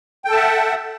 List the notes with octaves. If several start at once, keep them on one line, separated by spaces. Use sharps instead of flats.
A4 E5 F#5 G5 A5